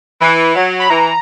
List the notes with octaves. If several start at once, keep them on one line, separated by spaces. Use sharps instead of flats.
E3
F#3
B5
E3 A#5